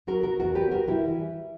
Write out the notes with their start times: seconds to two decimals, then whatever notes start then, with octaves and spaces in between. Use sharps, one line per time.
0.07 F#3 F#4 A#4
0.23 B3 F#4 A#4
0.40 E2 F#4 A#4
0.55 B3 G4 B4
0.71 G3 F#4 A#4
0.88 G3 E4 G4
1.04 E3
1.20 G3